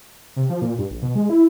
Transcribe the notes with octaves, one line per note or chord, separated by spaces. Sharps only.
C3
F3
A#2
G2
A#1
B2
G#3
E4